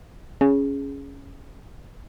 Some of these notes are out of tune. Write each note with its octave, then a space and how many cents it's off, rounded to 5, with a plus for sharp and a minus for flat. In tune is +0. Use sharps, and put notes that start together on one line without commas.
C#4 +0 G#4 +0